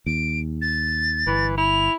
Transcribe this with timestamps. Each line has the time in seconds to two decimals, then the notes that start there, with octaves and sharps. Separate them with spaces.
0.06 D#2 D7
0.62 A6
1.27 G1 E3
1.57 E4 F7